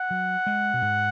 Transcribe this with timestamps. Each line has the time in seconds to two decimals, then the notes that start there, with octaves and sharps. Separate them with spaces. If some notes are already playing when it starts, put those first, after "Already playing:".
Already playing: F#5
0.11 F#3
0.47 G#3
0.74 B2
0.82 G#2